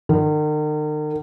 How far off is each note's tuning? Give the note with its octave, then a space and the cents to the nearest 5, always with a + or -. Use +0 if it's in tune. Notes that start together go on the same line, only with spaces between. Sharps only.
D#3 -45